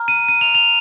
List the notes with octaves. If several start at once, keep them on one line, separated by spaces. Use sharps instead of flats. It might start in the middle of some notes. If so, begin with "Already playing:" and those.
Already playing: A#5 F6
D#7
D#7
F7
F7